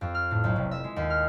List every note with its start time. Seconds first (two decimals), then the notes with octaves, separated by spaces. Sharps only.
0.01 F2
0.15 F6
0.31 A2
0.44 B1
0.56 F1
0.71 E5
0.84 G#3
0.96 D#2
1.10 F6